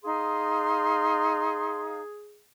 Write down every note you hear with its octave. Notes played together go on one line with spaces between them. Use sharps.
D#4 G#4 F5 C6